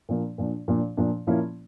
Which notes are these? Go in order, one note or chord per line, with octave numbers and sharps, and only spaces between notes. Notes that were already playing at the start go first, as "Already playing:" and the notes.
A#2 F3 A#3 D4
A#2 F3 A#3 D4
A#2 F3 A#3 D4
A#2 F3 A#3 D4
A#2 F3 A#3 C#4 E4